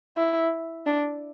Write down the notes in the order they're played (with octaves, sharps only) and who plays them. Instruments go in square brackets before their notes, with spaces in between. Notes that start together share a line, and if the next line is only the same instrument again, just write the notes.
[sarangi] E4
D4